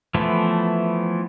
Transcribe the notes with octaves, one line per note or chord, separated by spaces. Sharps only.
E3 F3 A3 B3 E4